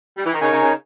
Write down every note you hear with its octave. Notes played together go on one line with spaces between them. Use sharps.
G3
E3
D#3
C#3 D#4 A#4 C#5 G#5
C#3
C#3